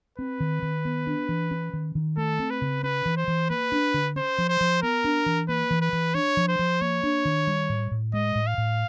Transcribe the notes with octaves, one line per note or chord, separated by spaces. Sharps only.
C4 B4
D#3
D#3
B3
D4
E3
C#4
D#3
D#3
A3 A4
C4
B4
C#3
C#4 B4
E3
C5
E3
A#3 B4
D4
D3
C#4 C5
F3
C5
F3
B3 A#4
D4
E3
A#3 B4
E3
B4
E3
D4 C#5
F3
C5
F3
A#3 C#5
D4
D#3
G3
A2
A2
G#3 D#5
A2
F5
A2